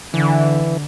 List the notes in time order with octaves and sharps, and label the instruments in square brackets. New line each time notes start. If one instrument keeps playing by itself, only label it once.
[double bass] D3 [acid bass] E3